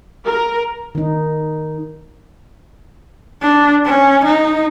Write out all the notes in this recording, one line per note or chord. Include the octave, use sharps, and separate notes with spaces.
A#4
D#3 D#4
D4
C#4
D#4